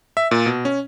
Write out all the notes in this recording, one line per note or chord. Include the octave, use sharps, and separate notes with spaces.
E5
A#2
B2
C#4